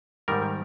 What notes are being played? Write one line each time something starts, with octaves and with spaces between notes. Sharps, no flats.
G#2 D#3 G3 A#4